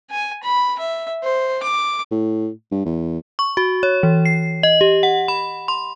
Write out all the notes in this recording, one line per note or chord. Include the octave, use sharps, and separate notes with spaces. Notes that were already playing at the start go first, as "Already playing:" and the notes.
G#5
B5
E5
C5
D6
A2
G2
E2
C#6
F#4
C#5
E3
C7
D#5
G4
F#5
B5
C6